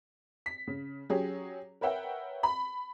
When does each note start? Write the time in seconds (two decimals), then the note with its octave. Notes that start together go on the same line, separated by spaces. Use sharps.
0.46 B6
0.67 C#3
1.10 F#3 C#4 G4 G#4 C#5
1.81 A#4 B4 C#5 E5 F#5 G5
2.43 B5